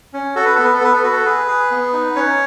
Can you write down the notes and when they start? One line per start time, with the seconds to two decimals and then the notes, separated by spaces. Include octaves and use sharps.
0.13 C#4
0.36 F#4 A4
0.45 B4
0.55 B3 A4
0.65 B4
0.74 A4
0.81 B3 B4
0.94 A4
1.03 F#4 B4
1.12 A4
1.25 G#4 B4
1.48 G#4
1.71 B3
1.93 D#4
2.16 C#4 C#5